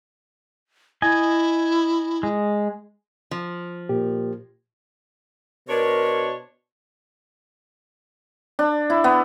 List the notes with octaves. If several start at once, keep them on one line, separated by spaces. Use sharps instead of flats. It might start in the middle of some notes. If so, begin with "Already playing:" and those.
E4 D#5 G#5
G#3
F3
A#2 G4
B2 D4 A#4 C5 C#5
D4
E4
B3